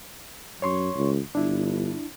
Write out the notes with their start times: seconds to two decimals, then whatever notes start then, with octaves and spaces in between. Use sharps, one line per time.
0.62 F#2 C#5 C6 C#6
0.96 C#2
1.35 G1 D4 E4